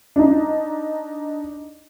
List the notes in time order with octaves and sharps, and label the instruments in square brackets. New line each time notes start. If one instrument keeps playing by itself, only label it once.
[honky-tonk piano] D4 D#4